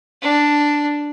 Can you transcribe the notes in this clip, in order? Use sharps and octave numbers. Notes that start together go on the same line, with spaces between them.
D4